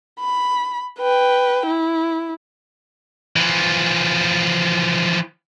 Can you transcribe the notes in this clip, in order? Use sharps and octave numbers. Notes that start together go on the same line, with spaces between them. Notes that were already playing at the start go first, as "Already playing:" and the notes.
B5
B4 G5
E4
E3 F3